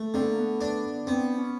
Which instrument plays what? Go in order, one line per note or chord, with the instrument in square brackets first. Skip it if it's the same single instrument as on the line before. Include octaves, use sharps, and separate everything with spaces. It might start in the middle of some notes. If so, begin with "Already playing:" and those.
Already playing: [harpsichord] A3
[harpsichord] D3 [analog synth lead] C4
[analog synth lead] B3
A#3
B3
[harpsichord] D4
[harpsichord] B3 [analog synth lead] C4
[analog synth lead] C#4